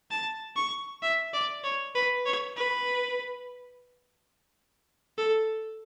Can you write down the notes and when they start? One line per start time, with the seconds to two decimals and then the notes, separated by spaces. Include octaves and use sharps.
0.10 A5
0.56 C#6
1.02 E5
1.33 D5
1.64 C#5
1.95 B4
2.25 C#5
2.56 B4
5.17 A4